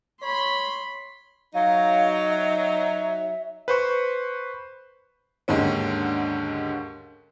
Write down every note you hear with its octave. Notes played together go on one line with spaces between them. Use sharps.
C#5 B5 C6
F#3 D#4 F5
E5
B4 C5 C#6
D#2 G#2 D3 C#4